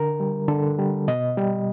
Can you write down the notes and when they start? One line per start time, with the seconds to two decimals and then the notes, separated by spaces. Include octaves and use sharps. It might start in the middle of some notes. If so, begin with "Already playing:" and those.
Already playing: D3 A#4
0.20 G3
0.48 D3 A4
0.79 G3
1.08 B2 D#5
1.37 G3